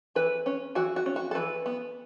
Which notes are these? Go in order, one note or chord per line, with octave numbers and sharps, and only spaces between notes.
E3 B4
C#4
E3 F#4
F#4
C#4
F#4
A4
E3 B4
B3